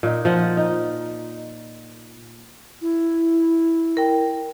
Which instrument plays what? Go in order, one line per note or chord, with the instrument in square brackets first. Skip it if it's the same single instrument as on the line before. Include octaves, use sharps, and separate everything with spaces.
[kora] A#2 D#4
F3 D#5 F#5
D#4
[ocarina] E4
[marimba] A#4 G5